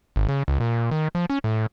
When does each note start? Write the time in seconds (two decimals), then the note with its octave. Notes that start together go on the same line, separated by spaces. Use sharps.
0.16 G#1
0.29 C#3
0.48 C#2
0.60 A#2
0.91 D#3
1.15 F3
1.30 C#4
1.44 A2